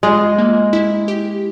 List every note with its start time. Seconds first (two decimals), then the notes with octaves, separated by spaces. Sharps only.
0.03 G#3 F4
0.38 A#3
0.73 E4
1.08 G4